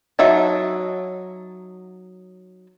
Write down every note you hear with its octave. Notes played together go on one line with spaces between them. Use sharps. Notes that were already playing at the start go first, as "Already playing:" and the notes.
F#3 D#4 E5 A5